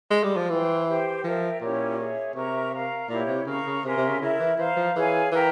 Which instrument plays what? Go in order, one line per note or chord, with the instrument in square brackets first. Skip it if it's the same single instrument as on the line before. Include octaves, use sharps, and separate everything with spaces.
[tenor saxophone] G#3
G3
F3
[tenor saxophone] E3 [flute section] C5 G5 C6
[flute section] G4 C5 G5
[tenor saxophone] F3 [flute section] A#4 E5 G5
[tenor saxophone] A#2 [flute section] C#4 E4 G4 C#5
[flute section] G#4 C#5 E5
[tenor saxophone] C3 [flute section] A#4 E5 A#5 C#6
[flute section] A#4 F5 A#5
[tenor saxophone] A#2 [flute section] E4 G4 C#5
[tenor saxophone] C3
[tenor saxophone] C#3 [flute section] A#4 F5 A#5 C#6
[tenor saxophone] C#3
[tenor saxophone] C3 [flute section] A#4 E5 G#5 C6
[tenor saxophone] C3
C#3
[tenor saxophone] C#3 [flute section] E4 A#4 E5
[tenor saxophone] E3
[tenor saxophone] E3 [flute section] C5 F5 A#5
[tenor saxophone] F3
[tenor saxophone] E3 [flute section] G#4 C#5 F5 G#5
[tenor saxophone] E3 [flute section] A#4 E5 G5 A#5